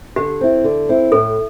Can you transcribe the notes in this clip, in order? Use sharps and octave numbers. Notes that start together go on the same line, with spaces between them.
D3 G4
C4 E4
D3
C4 E4
A2 A4